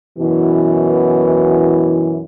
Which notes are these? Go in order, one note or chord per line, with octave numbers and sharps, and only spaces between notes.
F#2 B2 E3